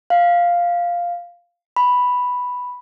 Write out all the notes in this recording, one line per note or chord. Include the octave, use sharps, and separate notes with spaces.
F5
B5